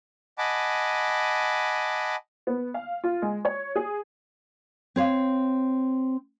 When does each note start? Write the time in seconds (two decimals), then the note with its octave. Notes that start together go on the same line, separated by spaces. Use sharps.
0.38 D#5 F#5 G#5 A5 B5 D6
2.47 B3
2.74 F5
3.04 F4
3.22 G#3
3.45 C#5
3.76 G#4
4.96 C4 C#5 F5